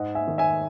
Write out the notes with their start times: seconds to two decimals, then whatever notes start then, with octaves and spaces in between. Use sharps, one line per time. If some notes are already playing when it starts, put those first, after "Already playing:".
Already playing: G#2 D#5 F#5
0.15 E5 G#5
0.28 D#3
0.38 E5 G#5